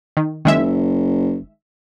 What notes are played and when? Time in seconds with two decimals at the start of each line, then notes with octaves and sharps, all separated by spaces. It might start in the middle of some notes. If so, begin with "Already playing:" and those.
0.17 D#3
0.45 F#1 D#3 G#3 E5